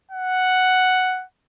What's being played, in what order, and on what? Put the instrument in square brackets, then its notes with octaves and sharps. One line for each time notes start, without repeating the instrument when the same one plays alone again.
[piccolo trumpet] F#5